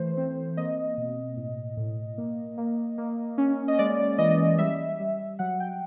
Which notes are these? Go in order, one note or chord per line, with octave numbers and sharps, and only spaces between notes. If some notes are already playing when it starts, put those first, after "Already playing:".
Already playing: E3 A3 C5
C4
A#3 D#5
B2
A2
A2
A#3
A#3
A#3
C#4
D#5
G#3 D5
E3 D#5
G3 E5
G3
F#3 F#5
G5